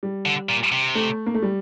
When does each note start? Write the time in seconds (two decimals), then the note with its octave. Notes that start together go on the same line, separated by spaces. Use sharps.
0.03 G3
0.26 D3
0.49 A#2
0.72 C3
0.95 A3
1.26 A#3
1.34 A3
1.42 G3